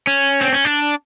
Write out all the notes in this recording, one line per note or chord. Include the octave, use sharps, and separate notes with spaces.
C#4
C4
C#4
D4